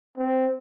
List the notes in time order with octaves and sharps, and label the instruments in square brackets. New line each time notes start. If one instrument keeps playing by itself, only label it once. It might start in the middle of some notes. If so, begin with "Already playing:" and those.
[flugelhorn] C4